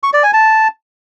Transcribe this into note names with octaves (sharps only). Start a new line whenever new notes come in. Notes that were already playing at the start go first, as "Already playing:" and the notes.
C#6
D5
G#5
A5